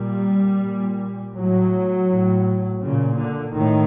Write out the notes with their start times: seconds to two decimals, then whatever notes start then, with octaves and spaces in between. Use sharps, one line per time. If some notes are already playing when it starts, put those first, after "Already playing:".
Already playing: A#2 G3
0.61 A#2
1.34 A2 F#3
2.08 A2
2.81 A#2 C#3
3.17 D3
3.54 A2 D#3